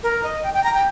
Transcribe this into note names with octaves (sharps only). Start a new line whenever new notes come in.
A#4
D#5
G5
G5
A#5
G5